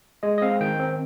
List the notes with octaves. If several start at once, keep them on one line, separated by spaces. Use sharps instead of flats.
G#3 D#5
D#5
C4 F5
D#3 G5
C4